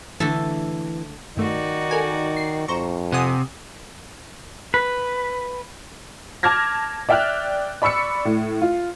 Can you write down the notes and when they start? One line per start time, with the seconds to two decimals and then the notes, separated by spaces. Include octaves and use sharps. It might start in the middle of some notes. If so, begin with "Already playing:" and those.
0.20 D3 E3 A3 A4
1.37 G2 D#3 A3 D#4 F#4 D5
1.91 A4 A#4 G#5
2.37 C7
2.68 F2 C5 A#5 C#6
3.12 C3 F#5 G#5 D#6
4.74 B4
6.43 A5 D6 F6 G#6 A#6
7.09 D5 E5 G5 F6 F#6
7.82 D5 B5 C#6 E6 C#7
8.25 A2
8.62 F4